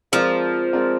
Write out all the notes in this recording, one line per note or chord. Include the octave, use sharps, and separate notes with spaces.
F3 G#3 C4 F4 A#4 D5
G#3 C4 F4 A#4 D5